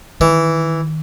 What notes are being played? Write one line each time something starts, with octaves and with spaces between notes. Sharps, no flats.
D#3 E3